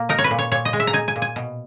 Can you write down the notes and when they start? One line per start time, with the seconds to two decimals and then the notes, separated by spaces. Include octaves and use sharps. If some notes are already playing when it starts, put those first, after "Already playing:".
Already playing: A#2 A#3
0.09 D#4 A#4
0.18 C#5
0.24 B4
0.31 A#2
0.38 C#5
0.51 A#2 C#5
0.65 D#5
0.73 G#3
0.80 E5
0.87 A#5
0.93 D#4 G#5
1.08 G#5
1.16 A#2
1.22 G#5
1.36 B2